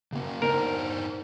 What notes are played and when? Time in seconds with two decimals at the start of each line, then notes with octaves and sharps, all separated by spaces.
0.13 C#3 A#3
0.42 D4 D#4 A#4 C5